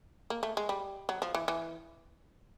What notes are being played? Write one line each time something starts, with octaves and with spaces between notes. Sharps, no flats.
A#3
A3
G#3
G3
F#3
F3
E3
E3